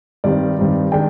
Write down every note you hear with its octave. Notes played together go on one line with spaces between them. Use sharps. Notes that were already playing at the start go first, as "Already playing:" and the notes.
G2 D#3 G3 C4 D5
G2 D#3 G3 C4
D#3 G#3 D4 G5